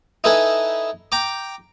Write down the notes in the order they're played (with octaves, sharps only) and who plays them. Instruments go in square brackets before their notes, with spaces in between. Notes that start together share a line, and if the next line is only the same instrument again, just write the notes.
[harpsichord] D#4 E4 A4 B4 E5 G#5
G5 A#5 D6